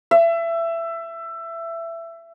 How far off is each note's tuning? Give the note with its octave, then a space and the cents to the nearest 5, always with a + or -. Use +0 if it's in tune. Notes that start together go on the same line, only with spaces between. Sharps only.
E5 +20